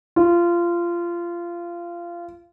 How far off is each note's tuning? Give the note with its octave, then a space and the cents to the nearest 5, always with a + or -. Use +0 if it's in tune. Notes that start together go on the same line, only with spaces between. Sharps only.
F4 -20